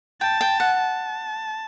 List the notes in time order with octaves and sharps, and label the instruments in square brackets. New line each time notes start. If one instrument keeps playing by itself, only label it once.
[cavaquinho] G5 [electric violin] A5
[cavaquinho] G5
F#5
[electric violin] A5